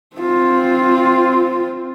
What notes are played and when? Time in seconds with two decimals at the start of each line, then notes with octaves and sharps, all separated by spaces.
0.17 C4 F4